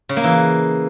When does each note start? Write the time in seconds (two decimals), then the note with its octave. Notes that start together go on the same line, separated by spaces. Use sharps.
0.09 C#3
0.17 A#3
0.24 E3